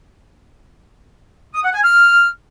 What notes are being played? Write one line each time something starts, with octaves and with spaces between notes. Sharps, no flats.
D#6
F#5
G#5
F6